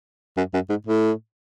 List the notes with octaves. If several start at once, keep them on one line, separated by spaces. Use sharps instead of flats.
F#2
F#2
G#2
A2